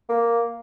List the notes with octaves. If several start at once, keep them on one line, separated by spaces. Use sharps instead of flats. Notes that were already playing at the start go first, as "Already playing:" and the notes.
A#3